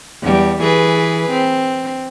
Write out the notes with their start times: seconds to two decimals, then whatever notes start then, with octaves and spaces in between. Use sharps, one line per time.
0.22 E2 G3
0.61 E3 G#4 B4
1.31 C4